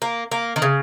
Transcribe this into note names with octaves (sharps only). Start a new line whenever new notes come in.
A#3
A#3
D#3
C#3